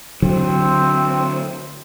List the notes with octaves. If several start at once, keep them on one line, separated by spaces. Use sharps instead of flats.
D3 F#3 C4